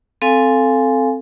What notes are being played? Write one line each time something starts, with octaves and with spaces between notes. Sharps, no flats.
C4 A4 F5 G#5